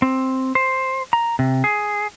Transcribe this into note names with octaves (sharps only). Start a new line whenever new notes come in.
C4
C5
A#5
C3
G#4